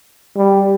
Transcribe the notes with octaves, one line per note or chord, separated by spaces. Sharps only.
G3